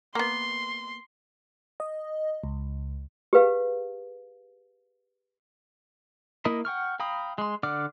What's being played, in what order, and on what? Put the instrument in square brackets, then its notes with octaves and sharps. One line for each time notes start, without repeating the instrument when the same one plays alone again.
[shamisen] A#3 B3 [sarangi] C6
[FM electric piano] D#5
C#2
[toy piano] G4 G#4 B4 F5
[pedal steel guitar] A#3 E4 A#4 D#5 B5
F#5 G5 C#6 F6
F5 G5 A#5 B5 D#6
G#3 C6
D3 D5 F#5 D6 F6